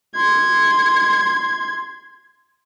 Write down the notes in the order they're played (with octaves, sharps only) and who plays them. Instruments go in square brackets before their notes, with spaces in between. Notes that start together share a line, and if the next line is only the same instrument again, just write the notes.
[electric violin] C6 G#6